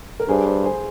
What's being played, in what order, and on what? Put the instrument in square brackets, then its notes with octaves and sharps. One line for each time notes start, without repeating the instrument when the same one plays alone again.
[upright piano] A#4
[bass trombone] G2 [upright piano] G#4 C5
[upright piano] G#4 C5
G#4 C5